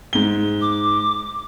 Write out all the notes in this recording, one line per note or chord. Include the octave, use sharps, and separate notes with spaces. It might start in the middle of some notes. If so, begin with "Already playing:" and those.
G#2 G7
D6